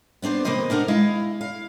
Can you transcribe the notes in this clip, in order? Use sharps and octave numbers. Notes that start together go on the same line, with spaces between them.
B3 C4 D4 C5
C3 D#3 A#3 B4 C5 D#5
D4 D#4 A#4 F#5
G#3 E4 D#5 F5
F5